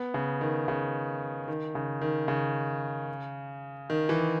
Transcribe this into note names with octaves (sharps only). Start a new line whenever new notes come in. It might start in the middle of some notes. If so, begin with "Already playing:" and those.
Already playing: B3
C#3
D#3
C#3
D#3
C#3
D#3
C#3
D#3
E3